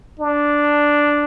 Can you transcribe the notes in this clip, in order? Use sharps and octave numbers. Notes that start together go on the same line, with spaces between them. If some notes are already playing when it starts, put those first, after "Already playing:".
D4